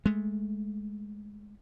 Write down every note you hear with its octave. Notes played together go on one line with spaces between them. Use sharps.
G#3 A3